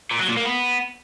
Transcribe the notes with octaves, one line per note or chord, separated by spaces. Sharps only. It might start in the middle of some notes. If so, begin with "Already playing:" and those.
A#2
F#3
A#2
A#3
B3